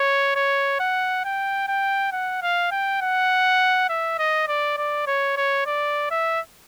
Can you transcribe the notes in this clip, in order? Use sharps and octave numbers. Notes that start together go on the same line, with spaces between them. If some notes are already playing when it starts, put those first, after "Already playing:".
Already playing: C#5
C#5
F#5
G5
G5
F#5
F5
G5
F#5
E5
D#5
D5
D5
C#5
C#5
D5
E5